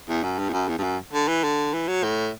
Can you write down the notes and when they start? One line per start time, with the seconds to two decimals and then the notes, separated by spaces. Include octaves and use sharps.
0.08 E2
0.23 F#2
0.39 G2
0.49 E2
0.53 F#2
0.69 E2
0.78 G2
0.83 F#2
1.13 D3
1.28 E3
1.44 D3
1.74 E3
1.88 F#3
2.04 A2